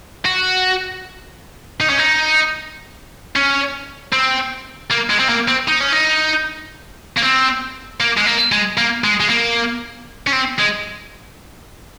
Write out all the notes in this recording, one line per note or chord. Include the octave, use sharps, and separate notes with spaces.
F#4
D#4
C#4
D#4
C#4
C4
A#3
G#3
C4
A#3
C4
D#4
C#4
D#4
A#3
C4
A#3
G#3
A#3
G#3
A#3
G#3
G#3
A#3
C#4
C4
G#3